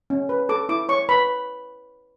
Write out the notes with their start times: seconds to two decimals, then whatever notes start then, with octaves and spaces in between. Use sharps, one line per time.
0.10 C#4
0.29 B4
0.49 A4 D6
0.69 E4 D6
0.89 C#5 C#6
1.09 B4 B5